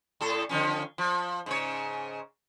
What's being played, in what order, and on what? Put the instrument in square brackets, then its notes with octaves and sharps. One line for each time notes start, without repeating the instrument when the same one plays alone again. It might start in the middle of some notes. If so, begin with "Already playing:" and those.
[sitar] A2 A4
D3 F3 C#4
F3
G#2 C#3 C#5